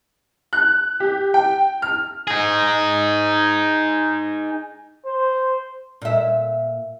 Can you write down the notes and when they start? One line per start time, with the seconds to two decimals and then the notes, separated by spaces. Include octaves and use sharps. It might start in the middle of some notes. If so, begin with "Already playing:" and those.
0.53 F#6
1.00 G4
1.34 G5
1.82 F6
2.27 D#4 G#4
5.05 C5
6.02 A#2 E5